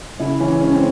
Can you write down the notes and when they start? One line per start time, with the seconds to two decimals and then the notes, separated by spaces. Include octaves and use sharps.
0.20 C#3 E4
0.40 E3 C#4
0.61 G#3 C#4
0.74 C4